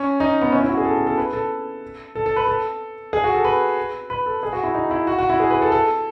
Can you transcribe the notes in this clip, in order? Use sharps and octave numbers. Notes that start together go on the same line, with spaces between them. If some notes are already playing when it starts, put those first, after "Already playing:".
Already playing: C#4
D#4
B3
C#4
E4
F#4
G#4
A4
A4
A4
B4
A4
A4
A4
B4
A4
G#4
F#4
A4
B4
B4
A4
G#4
F#4
E4
D#4
E4
F#4
F#4
E4
G#4
B4
A4
A4